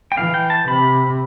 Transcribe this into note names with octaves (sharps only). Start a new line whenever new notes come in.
G5
E3 F5
G5
A5
C3 B5